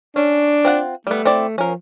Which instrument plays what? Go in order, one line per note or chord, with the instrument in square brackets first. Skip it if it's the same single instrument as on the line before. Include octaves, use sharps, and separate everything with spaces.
[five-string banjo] C#4 [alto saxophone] D4
[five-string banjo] C4 F4 F#5
[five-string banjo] G3 B3 [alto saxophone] A3
[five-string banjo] C4 E4 D5
[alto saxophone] F3 [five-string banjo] C#4 A#4